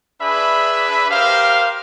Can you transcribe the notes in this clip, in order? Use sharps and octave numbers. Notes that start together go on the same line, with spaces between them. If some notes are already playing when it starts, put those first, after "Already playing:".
D4 G#4 B4 E5 B5
G4 A#4 C5 F5